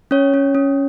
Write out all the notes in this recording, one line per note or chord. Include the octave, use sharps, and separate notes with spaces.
C#4 C#5
C#4
C#4